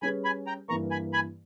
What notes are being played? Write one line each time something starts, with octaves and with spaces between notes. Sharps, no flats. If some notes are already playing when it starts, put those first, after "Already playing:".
G3 C#4 G#4 B4 G#5 B5
G#5 B5
G5 A#5
G2 E3 A#3 A#5 C#6
G#5 B5
G#5 B5